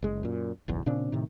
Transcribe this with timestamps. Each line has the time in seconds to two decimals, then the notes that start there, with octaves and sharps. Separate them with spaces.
0.03 F#1 G#3
0.23 F#2 A#2
0.68 F#1 B1 E2
0.86 A#2 C#3 C4 D4
1.12 A2 C3 D#3